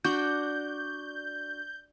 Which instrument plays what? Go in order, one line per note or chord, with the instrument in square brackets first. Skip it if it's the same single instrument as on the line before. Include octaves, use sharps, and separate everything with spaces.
[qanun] D4 F#4 [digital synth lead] G6